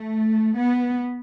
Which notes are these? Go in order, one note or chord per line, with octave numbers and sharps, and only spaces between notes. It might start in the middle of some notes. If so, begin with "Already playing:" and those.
Already playing: A3
B3